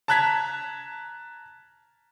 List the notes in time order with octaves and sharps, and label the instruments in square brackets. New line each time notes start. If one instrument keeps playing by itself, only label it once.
[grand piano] A5 A#5 F#6 G#6 B6